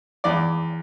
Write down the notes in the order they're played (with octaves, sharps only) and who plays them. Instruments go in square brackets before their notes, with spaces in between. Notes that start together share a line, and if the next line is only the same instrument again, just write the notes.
[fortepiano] E2 D5